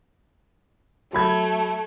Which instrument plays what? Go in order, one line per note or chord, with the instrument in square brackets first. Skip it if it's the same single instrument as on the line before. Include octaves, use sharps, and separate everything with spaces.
[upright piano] F#3 B5 G#6 [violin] A3